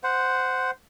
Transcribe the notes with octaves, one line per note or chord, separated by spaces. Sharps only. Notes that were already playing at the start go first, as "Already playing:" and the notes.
C5 F#5